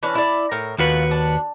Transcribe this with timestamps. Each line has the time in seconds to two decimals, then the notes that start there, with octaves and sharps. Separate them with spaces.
0.03 E3 C#4 D4
0.15 E4 D5
0.51 A2 A#4
0.78 D#2 F4 F#4 B4
1.11 D4